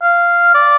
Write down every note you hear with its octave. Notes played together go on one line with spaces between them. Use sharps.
F5
D5